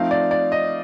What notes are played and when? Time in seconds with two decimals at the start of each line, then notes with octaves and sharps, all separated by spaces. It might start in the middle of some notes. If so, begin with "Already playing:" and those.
Already playing: F3 A3 C4 D#4 F5
0.11 D5
0.31 D5
0.52 D#5